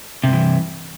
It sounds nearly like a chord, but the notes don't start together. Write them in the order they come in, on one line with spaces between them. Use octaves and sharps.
C3 G2 E3